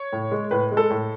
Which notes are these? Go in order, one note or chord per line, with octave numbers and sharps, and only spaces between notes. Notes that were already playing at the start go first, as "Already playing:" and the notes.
Already playing: C#5
A2
G#3
A2 B4
G#3
A4
A2